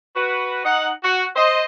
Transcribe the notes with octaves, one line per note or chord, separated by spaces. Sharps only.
F#4 B4
D#4 F#5
F#4
C5 D#5